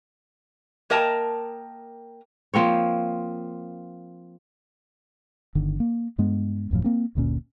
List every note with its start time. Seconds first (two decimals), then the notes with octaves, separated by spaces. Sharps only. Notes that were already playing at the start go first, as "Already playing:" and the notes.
0.90 A#3 A#4 D#5 G5 A5 A#5
2.54 F3 A#3 C4 C#5
5.55 G1 D3 D#3
5.80 A#3
6.18 G2 G#3 B3
6.71 D1 F2 A2 F3
6.84 A#3 C4
7.15 F#1 D2 A#2 C#4